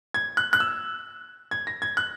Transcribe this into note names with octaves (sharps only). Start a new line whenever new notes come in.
G#6
F#6
F#6
E6
G#6
A#6
G#6
F#6